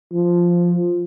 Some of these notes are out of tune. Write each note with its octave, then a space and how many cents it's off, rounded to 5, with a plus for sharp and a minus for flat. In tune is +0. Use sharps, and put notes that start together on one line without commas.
F3 +0